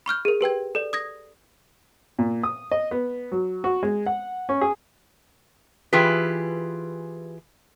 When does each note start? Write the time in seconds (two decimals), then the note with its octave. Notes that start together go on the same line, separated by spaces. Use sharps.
0.06 B5 C#6 F6 G6
0.25 G#4 A#4
0.41 G4 B4 G5 G#6
0.75 A4 D5
0.93 D#6 G#6 A#6
2.19 A#2
2.43 D#6
2.71 D#5
2.91 B3
3.32 F#3
3.64 F#4
3.83 G#3
4.06 F#5
4.49 C#4
4.61 G#4
5.93 E3 F4 G4 G#4 B4